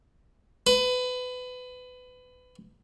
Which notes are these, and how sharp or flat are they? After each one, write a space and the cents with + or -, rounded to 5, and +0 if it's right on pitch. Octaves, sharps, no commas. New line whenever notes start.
B4 +25